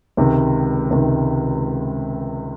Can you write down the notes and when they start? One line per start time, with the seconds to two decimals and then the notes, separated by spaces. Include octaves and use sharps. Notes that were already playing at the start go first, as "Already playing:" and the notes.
0.17 C#2 C3 D#3
0.91 C#2 C3 D#3